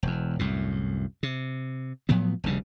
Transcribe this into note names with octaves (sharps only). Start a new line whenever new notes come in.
E1 E2
C2 F#2 A2
C3
A2 F3 F#3 B3
F1 D2 C#3 G3